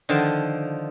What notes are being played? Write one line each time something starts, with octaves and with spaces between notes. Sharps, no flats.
D3 D#3 F3 A5